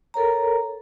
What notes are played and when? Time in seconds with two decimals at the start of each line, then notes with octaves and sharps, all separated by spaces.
0.14 A4 A#4 C#5 A#5